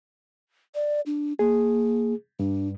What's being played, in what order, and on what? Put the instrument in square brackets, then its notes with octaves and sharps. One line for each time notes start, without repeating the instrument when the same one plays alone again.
[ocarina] D5
D4
[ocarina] A#3 [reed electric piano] G#4
[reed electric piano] G2 [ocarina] D4